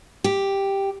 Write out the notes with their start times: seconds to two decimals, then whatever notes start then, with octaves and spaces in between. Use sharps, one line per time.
0.24 G4